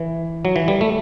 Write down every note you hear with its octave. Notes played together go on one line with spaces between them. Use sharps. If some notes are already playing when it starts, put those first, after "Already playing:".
Already playing: E3
F#3
E3
G3
A3